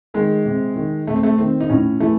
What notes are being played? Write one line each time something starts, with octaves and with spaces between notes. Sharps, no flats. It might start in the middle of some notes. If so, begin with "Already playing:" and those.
D#3 G#3
C3
D#3
C3 A3
C4
A3
D#3 C4
D#4
A2 C#4
E3 A3